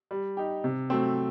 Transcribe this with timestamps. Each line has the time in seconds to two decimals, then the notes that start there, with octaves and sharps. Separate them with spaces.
0.11 G3
0.37 D#4 G4
0.64 C3
0.90 F#3 A3 C4